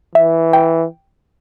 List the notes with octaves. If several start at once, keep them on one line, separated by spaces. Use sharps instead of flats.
E3 E5
G5